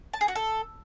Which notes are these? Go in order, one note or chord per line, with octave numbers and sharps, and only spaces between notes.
A5
G#4
F#4
A4